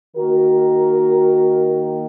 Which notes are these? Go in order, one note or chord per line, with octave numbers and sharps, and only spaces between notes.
D#3 A#3 F#4 A#4